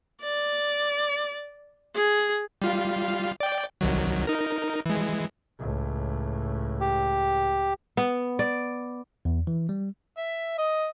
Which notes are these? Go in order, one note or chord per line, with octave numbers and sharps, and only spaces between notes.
D5
G#4
G3 F4 F5
D5 G5
C2 D#3 F#3
D#4 A#4
E3 G#3
C#2 A2
G4
B3
D5
E2
E3
G3
E5
D#5